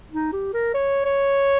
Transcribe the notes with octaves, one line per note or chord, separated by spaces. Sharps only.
D#4
G4
A#4
C#5
C#5